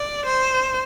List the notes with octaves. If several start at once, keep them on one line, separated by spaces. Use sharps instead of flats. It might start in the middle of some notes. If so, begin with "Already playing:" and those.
Already playing: D5
C5